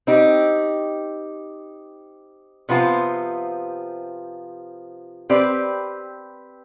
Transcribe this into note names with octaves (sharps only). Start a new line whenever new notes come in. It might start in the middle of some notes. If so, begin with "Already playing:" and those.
C4 D#4 G4
C3 F3 B3 F4 C5
C4 G4 B4 D5